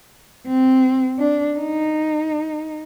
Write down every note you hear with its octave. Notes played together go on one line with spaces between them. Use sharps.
C4
D4
D#4